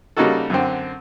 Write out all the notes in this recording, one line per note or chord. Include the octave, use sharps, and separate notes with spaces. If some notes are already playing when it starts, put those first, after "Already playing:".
C#3 G3 A#3 D#4 F#4 A4
F#2 D3 C4